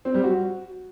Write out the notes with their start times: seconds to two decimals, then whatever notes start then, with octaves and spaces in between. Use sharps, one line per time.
0.05 C4
0.14 G3
0.24 F#4